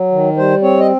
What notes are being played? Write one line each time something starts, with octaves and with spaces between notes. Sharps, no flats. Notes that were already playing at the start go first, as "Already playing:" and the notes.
Already playing: F#3
D#3
G3 C5
C4 C#5
D#5